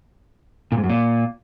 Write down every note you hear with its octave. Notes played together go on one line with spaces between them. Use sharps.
A#2
G#2
F#2
A#2